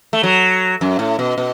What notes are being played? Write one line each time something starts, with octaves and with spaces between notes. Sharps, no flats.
A3
F#3
F#2
A2
B2
B2